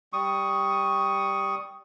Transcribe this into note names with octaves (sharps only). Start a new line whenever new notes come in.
G3 C#6 D#6